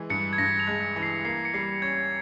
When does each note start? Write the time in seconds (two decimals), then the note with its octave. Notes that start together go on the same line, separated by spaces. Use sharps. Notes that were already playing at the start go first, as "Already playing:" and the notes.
Already playing: E3 G#3
0.10 G2 C#7
0.33 G#6
0.38 G2 A#6
0.60 F7
0.67 G#3
0.82 C#7
0.96 E3
1.03 C7
1.25 A#3 C7
1.45 C#7
1.54 G3 C7
1.82 C#4 G#6